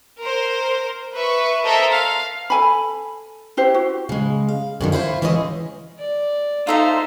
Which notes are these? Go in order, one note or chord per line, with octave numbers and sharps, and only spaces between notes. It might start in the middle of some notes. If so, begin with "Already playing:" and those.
A#4 C5
B4 E5 C#6
A4 A#4 C5 D#5 E5 A#5
F5
A4 G#5 B5
E4 G4 C5
F#4
C#3 G#3
F5
F#2 D3 D#3
E4 F4 B4 C5
E3 G#3 C#4 G#4 D5 D#5
D5
D#4 F4 A4 C5 E5